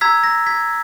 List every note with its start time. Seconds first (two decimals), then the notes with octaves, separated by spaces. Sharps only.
0.01 A#5 E6 G#6 B6
0.24 A#6
0.46 G#6 B6